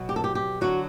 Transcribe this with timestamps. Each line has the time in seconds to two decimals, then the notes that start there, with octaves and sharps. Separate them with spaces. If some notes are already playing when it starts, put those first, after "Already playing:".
Already playing: B2 F#3
0.09 G4
0.16 A4
0.24 G4
0.35 G4
0.61 D3 F#3 F#4